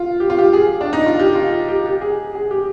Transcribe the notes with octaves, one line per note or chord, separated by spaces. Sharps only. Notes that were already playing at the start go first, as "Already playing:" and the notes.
Already playing: F4
G4
F4
G4
G#4
D4
D#4
F4
G4
F4
G4
G4
G#4
G#4
G4